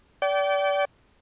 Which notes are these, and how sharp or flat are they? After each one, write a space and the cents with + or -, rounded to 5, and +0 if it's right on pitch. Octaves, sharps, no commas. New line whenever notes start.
D5 -30 G5 -30